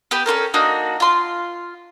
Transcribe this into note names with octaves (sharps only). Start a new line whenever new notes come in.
B3 G4 B4
C#4 F4 A4 A#4
A#3 D4 D#4 F#4
F4 C6